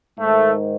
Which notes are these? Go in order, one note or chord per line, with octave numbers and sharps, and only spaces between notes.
G#2 D#3 A3